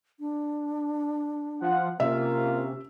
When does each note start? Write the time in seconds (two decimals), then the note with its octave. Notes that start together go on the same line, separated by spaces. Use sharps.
0.20 D4
1.61 F3 F4 F#5
2.00 C3 A#3 C#4 F4 E5